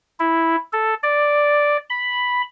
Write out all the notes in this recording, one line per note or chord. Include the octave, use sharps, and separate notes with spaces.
E4
A4
D5
B5